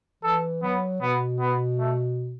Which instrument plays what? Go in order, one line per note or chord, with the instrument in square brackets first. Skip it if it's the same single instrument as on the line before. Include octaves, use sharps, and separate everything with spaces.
[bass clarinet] E3 [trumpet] A4
[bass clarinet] F#3 [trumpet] B3
[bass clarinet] B2 [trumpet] B3
[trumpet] B3
A3